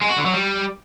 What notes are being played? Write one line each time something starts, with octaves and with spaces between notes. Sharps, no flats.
G#3
F#4
D3
F#3
G3